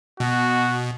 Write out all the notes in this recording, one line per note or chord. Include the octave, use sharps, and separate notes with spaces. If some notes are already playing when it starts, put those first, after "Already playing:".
B2 F#4